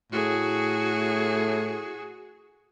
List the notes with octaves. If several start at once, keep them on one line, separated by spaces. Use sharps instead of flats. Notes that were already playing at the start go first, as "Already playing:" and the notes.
A2 F#4 G#4